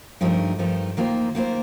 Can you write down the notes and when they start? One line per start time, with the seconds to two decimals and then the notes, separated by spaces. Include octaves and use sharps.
0.21 G2 F3 A3 D#4 A#4
0.59 G2 F3 A3 D#4 A#4
0.97 D#3 A#3 F4 C5
1.35 D#3 A#3 F4 C5